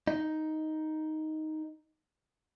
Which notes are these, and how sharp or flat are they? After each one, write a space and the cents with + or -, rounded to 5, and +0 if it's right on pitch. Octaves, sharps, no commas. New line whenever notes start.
D#4 +5